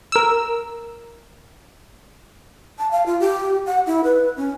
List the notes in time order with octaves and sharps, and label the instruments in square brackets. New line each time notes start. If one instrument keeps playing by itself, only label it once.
[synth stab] A#4 E6
[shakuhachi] A5
F5
F4
G4
F#5
E4
B4
C#4